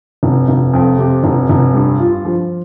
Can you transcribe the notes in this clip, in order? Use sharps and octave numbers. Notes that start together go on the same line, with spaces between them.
F1
F1
F2
C3
F1
F1
G2
F4
F3